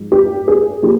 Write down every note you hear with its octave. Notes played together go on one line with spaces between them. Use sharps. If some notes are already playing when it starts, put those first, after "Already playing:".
Already playing: G#2 F3
G4
G#4
F3 A#3 G4